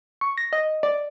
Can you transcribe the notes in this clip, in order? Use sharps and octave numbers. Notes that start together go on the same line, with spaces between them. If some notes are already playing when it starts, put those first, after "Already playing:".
C#6
A#6
D#5
D5